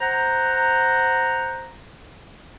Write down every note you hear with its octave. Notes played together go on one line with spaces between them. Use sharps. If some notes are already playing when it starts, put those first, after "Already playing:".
C5 F#5 A#5